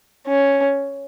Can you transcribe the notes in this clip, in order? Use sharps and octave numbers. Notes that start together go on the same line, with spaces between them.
C#4